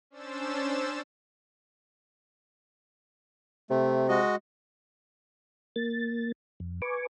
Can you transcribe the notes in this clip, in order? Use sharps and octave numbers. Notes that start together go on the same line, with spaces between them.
C#4 D4 C5 E6 A6 E7
C3 A3
G#3 F#4 D#5
A#3 A6
F2
B4 G#5 C#6 D6